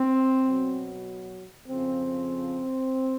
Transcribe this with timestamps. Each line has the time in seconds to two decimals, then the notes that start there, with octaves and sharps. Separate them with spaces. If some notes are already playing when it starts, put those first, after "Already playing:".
Already playing: C4
0.42 B2 F#3
1.68 F2 C#3 F3 C4